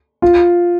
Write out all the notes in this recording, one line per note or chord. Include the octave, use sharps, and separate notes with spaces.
F4